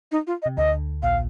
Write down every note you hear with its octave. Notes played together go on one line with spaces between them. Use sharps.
D#4
F4
D#5
C3
D2 D3 D#5
A#1 A#2 F5